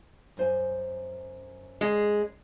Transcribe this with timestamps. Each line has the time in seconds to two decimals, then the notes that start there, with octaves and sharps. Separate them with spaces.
0.37 F#2 C5 G#5
1.81 G#3